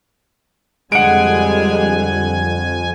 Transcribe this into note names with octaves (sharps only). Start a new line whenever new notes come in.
F2 D3 G3 G#3 F#5 G#5 D7